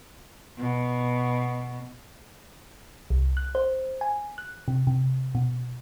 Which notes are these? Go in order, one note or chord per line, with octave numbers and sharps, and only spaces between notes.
B2
C2
F#6
C5
G#5
F#6
C3
C3
B2